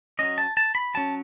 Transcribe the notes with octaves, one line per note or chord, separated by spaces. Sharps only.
F#3 C#4 D#5
A5
A5
B5
F#3 C#4 A5